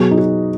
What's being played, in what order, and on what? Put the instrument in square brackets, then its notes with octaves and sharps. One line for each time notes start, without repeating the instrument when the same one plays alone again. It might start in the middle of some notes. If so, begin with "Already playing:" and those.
Already playing: [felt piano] B2 F#3 G#4
D#4
F#4